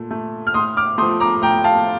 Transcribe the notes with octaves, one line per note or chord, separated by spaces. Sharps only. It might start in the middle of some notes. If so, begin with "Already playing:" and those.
Already playing: A#2 A3
A3
F6
A2 C6 D#6
D6 F6
F3 A3 C6 D#6
A#5 D6
A2 G5 A#5
F5 A5